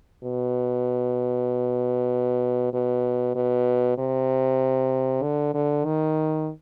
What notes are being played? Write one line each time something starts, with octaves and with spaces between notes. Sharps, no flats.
B2
B2
B2
C3
D3
D3
D#3